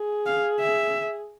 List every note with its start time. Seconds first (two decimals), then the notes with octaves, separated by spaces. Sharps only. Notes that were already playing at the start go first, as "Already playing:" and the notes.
Already playing: G#4
0.26 F5
0.60 E5